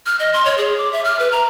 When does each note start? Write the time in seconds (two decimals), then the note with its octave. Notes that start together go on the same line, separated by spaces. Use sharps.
0.06 F6
0.20 D#5
0.34 C6
0.45 C#5
0.58 G#4
0.78 D6
0.92 E5
1.05 F6
1.19 B4
1.32 A#5